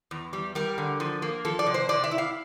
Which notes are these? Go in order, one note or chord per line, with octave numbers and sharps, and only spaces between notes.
E2
G3
G3 A#4
D3
F3
A#3
F3 A4
D5
C3
C5
C3 D5
E5
E4
F5